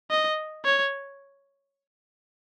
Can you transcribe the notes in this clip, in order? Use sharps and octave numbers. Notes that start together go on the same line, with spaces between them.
D#5
C#5